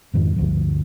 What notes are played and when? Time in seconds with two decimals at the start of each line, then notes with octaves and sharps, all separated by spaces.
0.14 F2 G#2 D#3
0.36 G1 D2 F3